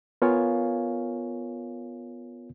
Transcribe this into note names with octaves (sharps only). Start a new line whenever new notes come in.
B3 F4 A#4 C#5 F5 G#5